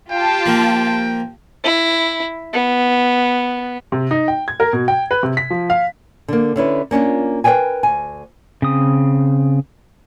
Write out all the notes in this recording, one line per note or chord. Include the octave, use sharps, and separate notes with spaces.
F4 G4 G5 A5
F3 A#3
E4
B3
C3
D#4
G5
G#6
A#4
B2
G5
B4
C3
B6
F3
F5
D3 A#3
D3 C#4 E4 B4
A#3 C#4 D4 F4
A#4 B4 C#5 D5 G5 G#5
D2 G#5
C#3 C4 D#6